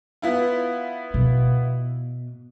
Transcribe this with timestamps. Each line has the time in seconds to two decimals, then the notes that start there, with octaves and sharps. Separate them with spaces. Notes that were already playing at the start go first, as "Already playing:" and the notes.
0.22 B3 E4 F4
1.14 B2